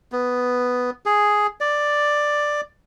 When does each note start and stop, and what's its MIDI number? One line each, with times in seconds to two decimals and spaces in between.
0.12 0.90 59
1.06 1.47 68
1.60 2.61 74